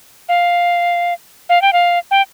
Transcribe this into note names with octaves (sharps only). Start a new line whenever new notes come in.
F5
F5
G5
F5
G5